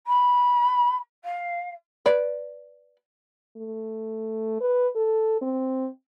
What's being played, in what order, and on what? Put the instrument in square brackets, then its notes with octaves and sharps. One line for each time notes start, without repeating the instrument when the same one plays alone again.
[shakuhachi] B5
F5
[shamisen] B4 D5
[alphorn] A3
B4
A4
C4